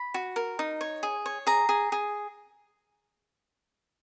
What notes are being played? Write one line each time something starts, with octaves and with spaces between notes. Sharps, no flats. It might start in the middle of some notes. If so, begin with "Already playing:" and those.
Already playing: B5
F#4
A#4
D#4
C#5
G#4
C#5
G#4 A#5
G#4
G#4